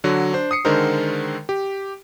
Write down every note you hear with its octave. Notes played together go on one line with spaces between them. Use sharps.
D3 F#3 F#4
D4 C5
D#6 C7 C#7
D3 D#3 G#3 A4 A#4 C5
G4